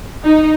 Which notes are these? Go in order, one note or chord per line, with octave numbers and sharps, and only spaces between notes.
D#4